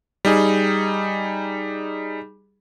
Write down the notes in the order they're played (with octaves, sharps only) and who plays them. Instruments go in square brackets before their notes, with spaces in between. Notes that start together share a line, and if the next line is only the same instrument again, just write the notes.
[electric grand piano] G3 D#4 G#4